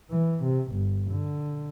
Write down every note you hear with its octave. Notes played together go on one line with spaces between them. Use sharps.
E3
C3
G1
D3